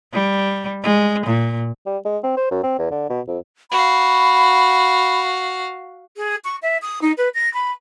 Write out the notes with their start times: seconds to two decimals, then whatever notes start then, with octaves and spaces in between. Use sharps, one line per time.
0.13 G3
0.83 G#3
1.26 A#2
1.86 G3
2.05 G#3
2.23 C4
2.37 C5
2.51 F#2
2.63 C4
2.78 E2
2.91 D3
3.10 B2
3.28 F2
3.71 F#4 F5 B5
6.16 G#4
6.44 C#6
6.62 E5
6.82 D#6
7.02 D#4
7.17 B4
7.34 A#6
7.54 B5